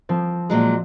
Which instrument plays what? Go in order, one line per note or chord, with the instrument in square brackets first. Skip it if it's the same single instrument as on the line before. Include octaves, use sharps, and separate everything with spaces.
[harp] F3 C4
[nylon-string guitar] A#2 F#3 G#3